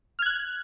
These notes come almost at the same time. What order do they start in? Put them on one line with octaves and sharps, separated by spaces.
F6 G#6 F#6